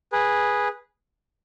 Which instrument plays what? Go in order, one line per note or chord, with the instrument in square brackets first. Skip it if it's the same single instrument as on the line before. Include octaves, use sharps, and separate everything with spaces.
[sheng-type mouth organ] G#4 B4